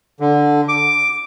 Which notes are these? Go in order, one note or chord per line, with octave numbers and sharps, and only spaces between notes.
D3
D6